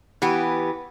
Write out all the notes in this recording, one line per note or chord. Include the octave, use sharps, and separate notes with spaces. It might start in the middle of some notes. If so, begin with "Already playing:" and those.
E3 B3 G4